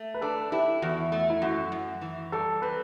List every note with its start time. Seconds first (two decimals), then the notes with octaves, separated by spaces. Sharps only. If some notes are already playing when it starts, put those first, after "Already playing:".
Already playing: A3
0.14 B4
0.21 D4 A4
0.52 E4 G4
0.82 E2 F#4
1.12 A3
1.30 E4
1.42 F#2 F#4
1.72 F#2
2.01 E3
2.32 G3 A4
2.62 C4 B4